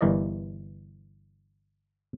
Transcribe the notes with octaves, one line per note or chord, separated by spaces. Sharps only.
G1 G2 E3 A#4 D5 D#5